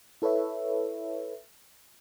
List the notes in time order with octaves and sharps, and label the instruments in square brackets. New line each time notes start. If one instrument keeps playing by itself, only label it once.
[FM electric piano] E4 A4 B4 C#5 E5